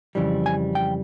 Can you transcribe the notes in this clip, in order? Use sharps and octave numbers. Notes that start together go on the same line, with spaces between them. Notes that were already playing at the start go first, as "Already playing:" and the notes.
F2 C#3 E3 G3
G#5
G5